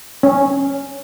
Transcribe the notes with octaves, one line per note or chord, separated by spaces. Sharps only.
C#4